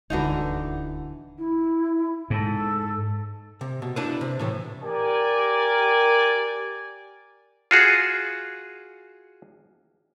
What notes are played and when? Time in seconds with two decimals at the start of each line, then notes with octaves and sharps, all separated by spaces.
0.10 D#1 D2 D3 E3 D#4 F#4 B4 A#5
1.37 E4
2.30 G#2 A4
3.61 C3
3.82 B2
3.96 D4 E4 B4
4.21 C3
4.39 A2 E3 A3
4.83 G4 A#4 D5 G#5
7.71 F4 F#4 G#4